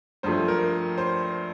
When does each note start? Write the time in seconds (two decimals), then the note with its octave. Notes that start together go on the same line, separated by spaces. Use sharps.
0.23 G2 F3 A3 C5
0.48 A#4
0.98 C5